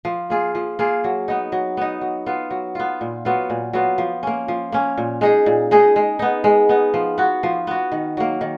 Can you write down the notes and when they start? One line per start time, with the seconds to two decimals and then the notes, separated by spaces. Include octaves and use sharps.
0.05 F3
0.30 A#3 F4 G#4
0.55 F3
0.79 A#3 F4 G#4
1.04 F#3
1.28 B3 D#4
1.52 F#3
1.77 B3 D#4
2.01 F#3
2.26 B3 F4
2.51 F#3
2.75 B3 F4
3.01 A#2
3.25 F#3 B3 F4
3.50 A#2
3.73 F#3 B3 F4
3.98 F3
4.23 A#3 C#4
4.48 F3
4.72 A#3 C#4
4.98 A#2
5.21 G#3 D#4 G#4
5.46 A#2
5.71 G#3 D#4 G#4
5.96 G#3
6.19 B3 D#4
6.44 G#3
6.69 B3 D#4
6.94 F3
7.18 B3 F#4
7.43 F3
7.67 B3 F#4
7.92 D#3
8.17 F#3 A#3
8.41 D#3